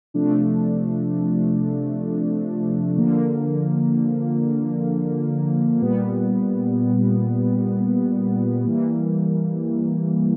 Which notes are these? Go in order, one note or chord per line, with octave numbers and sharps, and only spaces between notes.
C3 F3 A3 D4
D3 F3 A#3
A#2 G3 B3
E3 G3 A#3